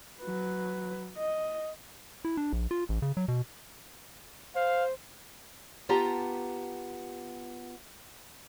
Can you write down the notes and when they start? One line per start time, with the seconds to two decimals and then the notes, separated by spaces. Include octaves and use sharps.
0.22 F#3 B4
1.17 D#5
2.25 E4
2.37 D4
2.53 A#1
2.71 F4
2.89 A1
3.02 C#3
3.17 F#3
3.28 B2
4.56 C5 F5
5.89 B3 F4 G4 A5 A#5